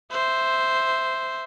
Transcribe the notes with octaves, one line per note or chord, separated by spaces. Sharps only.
C5 E5